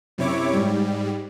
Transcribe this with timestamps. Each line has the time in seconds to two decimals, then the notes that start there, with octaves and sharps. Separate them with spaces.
0.18 F#2 C3 E4 C#5 D6
0.53 G#2 G3